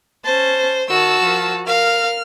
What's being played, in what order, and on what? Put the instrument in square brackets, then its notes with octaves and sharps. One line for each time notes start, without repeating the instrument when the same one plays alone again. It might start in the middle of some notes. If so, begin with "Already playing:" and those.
[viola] C#4 A5 [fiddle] C5
[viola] D#3 [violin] F#4 A5 [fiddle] E6
[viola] F3 A#4
[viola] A#4 [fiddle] F5 [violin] F6